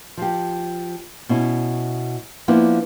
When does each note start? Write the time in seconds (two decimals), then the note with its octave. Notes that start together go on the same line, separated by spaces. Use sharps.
0.17 F3 G4
1.29 B2 C#4 E4
2.48 F3 A#3 B3 D4 E4